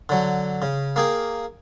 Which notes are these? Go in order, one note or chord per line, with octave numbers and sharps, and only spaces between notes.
D3 F#3
C#3
A#3 G#4 G5